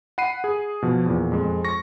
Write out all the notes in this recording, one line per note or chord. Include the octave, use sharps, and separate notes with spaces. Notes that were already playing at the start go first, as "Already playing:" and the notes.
F#5 B5 C7 D#7
G#4
B2 F3
E2 A#2
F2 G#3
C#6 A#6